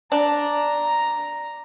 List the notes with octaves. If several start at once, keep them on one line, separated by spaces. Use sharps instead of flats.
D4 A#5